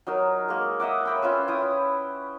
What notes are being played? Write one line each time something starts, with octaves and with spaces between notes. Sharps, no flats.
F#3 D#4 A#4
G#3 A#3
D#5 E5 F#5 D6
C#5 G5 B5
C#4 F4 B4 E6
E4 G5 D#6